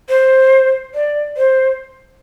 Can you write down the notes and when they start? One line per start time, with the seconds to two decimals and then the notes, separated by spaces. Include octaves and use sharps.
0.09 C5
0.94 D5
1.37 C5